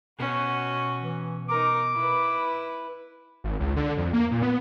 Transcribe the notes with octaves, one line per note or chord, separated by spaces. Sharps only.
B2 C#4 F#4
E3
D#4 A#4 D6
E4 B4
G#1
C#2
D3
F2
A#3
A#2
B3